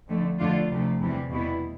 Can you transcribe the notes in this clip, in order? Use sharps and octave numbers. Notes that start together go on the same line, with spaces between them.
F2 D3 A3
F2 D3 A3 D4 F4
D2 C3 F3 A3
E2 C3 E3 G3 C4
E2 B2 G3 B3 E4